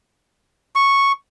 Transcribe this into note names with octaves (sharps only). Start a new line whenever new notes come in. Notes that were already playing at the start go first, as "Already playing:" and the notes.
C#6